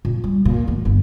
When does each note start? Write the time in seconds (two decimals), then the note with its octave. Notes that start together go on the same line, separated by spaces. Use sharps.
0.05 A#2
0.24 G3
0.45 A#2
0.67 E2 A2
0.85 G1